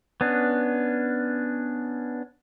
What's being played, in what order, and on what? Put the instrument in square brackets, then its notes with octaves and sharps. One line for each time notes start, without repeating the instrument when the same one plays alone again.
[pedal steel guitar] B3 C#4 D4